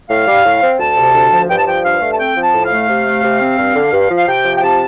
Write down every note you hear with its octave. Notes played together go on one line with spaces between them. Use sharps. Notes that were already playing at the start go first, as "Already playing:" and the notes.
A2 F5
G3
A2
C4
D2 A5
C3
D2
F3
G2 G5
A5
F3 G5
G2 F5
A3
A5
C4 G5
F3
A5
A2
F5
A3
C3
A3
C3
C4
G2
D3
G2
F3
F5
C3 G5
F3
G5
C3 A5